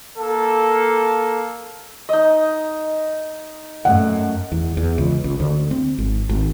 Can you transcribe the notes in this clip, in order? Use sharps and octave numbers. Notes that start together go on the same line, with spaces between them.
A#3 A4
D#4 D#5
F#2 A3 F#5
E2
E2
C#2
C#2
D2
C4
G#1
G#1